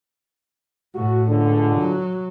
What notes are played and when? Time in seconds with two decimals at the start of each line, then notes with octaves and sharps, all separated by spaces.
0.95 A2 F#4
1.29 C#2 D3
1.76 F#3